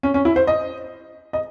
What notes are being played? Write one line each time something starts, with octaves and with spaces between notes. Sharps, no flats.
C#4
C#4
E4
C5
D#5
D#5